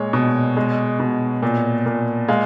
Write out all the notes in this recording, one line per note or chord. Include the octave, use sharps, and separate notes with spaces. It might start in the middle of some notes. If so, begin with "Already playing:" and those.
Already playing: A#2 G#3 C#5
B2
G#3
B2
A#2
A#2
G#3 F5